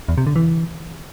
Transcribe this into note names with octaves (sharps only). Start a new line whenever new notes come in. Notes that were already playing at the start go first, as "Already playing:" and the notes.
E2
C3
D3
E3